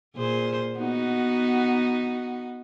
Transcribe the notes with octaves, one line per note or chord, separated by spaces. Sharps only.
A#2 G#4 C5
B3 D#4 F#4